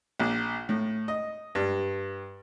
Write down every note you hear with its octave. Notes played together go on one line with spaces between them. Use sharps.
A#1
A2
D#5
G2